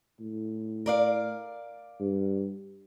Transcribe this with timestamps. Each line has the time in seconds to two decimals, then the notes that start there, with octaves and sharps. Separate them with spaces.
0.20 A2
0.86 A#4 D5 F5
2.00 G2